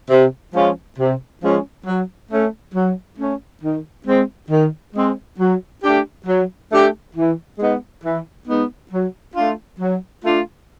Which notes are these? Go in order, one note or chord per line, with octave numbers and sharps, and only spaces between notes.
C3
F3 G#3 C#4 F4
C3
F3 G#3 C#4 F4
F#3
A3 C#4
F#3
A3 C#4
D#3
G#3 C4
D#3
G#3 C4
F#3
A3 D4 G4
F#3
A3 D4 G4
E3
G#3 B3 D#4
E3
G#3 B3 D#4
F#3
A3 D4 F4
F#3
A3 D4 F4